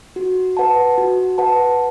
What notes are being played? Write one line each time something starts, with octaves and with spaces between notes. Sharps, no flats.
F#4
B4 F#5 A5
F#4
B4 F#5 A5